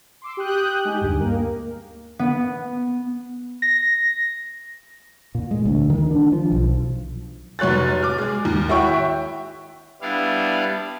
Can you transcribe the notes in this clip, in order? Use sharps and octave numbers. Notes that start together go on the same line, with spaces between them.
C6 D6 E6
G4 G5 D#6 F#6 G6
G#3 D#4 G4 G#5
D2 G2
A#3 A#4
B3
A#6
A#2
G#3
D2
D#3
D4
F3
B1
F1 F#3 C#5 F#6 A6
D6 F6
G#3 G#4
D#2
E4 F#4 C#5 E5 G5 C#6
G3 B3 D4 E4 F5